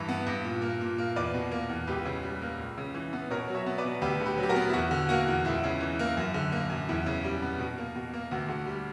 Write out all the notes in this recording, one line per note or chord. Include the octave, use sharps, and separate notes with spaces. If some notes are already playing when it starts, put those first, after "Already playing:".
Already playing: G2 E3 B4
B3
G2
A#2
A#3
A#2
A#3
E2 B4 D5
B2
A#3
E2
C#2 G4 B4
C#3
G3
A#3
C#2
C#3
E3
B3
B2 A#4 C#5
F#3
C#5 E5
B3
B4 D5
B2
D2 G4 B4
D3
G4 B4
F#3
G4
F#4 A#4
B3
E4
E2 F#4
D3
A#3 F#4
E2
C#2 E4
C#3
E3
A#3
F#2
D3
A#3
F#2
E2 E4
C#3
G3
B3
B2
A#3
B2
A#3
D2 F#4
D3
G3